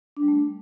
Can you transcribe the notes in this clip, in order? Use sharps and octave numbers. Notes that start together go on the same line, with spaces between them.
D4
G3
A3